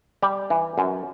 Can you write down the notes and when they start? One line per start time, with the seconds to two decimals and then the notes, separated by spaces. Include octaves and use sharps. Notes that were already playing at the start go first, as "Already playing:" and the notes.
0.22 G3 G4
0.50 E3
0.78 F#2